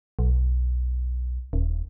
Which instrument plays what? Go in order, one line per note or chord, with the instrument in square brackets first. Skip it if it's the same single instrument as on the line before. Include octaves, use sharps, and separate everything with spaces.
[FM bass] B1
D#1